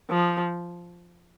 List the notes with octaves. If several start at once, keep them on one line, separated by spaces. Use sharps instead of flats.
F3